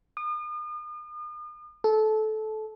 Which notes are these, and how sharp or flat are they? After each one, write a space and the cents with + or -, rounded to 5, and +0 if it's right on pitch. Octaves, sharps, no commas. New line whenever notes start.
D#6 -40
A4 -20